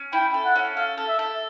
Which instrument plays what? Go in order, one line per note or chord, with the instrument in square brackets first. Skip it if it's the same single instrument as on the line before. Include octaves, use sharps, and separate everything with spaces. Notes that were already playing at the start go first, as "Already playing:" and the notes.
Already playing: [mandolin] C#4
[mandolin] E4 [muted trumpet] G5
[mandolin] A4
[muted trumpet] F#5
[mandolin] C#4
[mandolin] A4 [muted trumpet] F5
[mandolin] A4
[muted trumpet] E5
[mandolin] A4